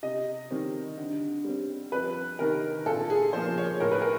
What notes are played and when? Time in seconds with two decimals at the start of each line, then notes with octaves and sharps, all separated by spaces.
0.03 C3 D#5
0.51 D#3 G3 C4
0.98 D3
1.44 G3 C4
1.92 F2 B4
2.39 C3 D#3 A#4
2.86 A#2 A4
3.10 G#4
3.33 F3 A#3 C5
3.58 C#5
3.80 A2 A#4
3.91 B4
4.02 A#4